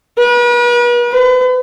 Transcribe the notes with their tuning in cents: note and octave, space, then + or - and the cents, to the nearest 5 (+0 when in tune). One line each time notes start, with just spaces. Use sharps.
B4 -40
B4 +40